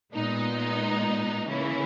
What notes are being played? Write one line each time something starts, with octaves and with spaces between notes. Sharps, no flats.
A#2 G#3 B3 D#4
C#3 E3 A#3 C#4 E4